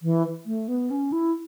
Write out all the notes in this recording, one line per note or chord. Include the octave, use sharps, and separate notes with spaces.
E3
A3
B3
C#4
E4